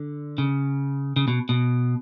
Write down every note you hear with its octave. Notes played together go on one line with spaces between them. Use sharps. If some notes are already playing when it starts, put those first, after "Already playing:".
Already playing: D3
C#3
C#3
B2
B2